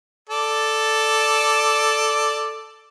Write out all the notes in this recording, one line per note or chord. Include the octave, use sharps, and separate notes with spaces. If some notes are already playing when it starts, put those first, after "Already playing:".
A4 D5